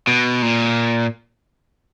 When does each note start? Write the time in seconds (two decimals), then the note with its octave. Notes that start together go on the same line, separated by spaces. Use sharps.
0.07 B2
0.42 A#2